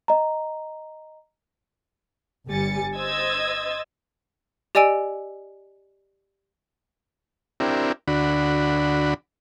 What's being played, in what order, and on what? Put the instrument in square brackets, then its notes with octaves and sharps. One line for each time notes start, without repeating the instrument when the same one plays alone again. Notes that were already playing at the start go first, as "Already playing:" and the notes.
[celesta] D#5 A#5
[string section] G1 G3 G#5 A6 C#7
C5 D#5 E6 G#6 A6
[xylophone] G4 D5 D#5 G#5 E6 D7
[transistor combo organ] C4 D4 E4 G4 A#4
D2 D3 D4 F#4 B5